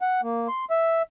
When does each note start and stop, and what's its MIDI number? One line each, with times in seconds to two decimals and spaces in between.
0.01 0.21 78
0.23 0.48 58
0.48 0.65 84
0.70 1.02 76